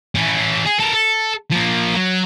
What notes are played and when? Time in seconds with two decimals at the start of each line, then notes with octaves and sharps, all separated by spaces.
0.15 E3 C#4
0.66 G#4
0.80 A4 A#4
0.93 A4
1.52 F3 A#3
1.95 F#3